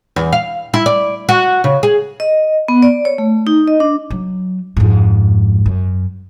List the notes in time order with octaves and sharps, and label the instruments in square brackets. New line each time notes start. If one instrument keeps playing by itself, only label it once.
[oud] E2
F5
E4
D5
F#4
C#3
G#4
[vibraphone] D#5
B3
D5
C#5
A3
D#4
D#5
D4
[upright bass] F#3
F2 G#2
F#2